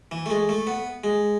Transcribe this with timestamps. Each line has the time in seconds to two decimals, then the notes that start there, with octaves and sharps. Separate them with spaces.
0.11 E3
0.26 A3
0.30 G#3
0.49 A3
0.67 B3
1.04 G#3